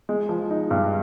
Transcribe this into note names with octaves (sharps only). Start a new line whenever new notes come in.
G#3
F3
D#4
G2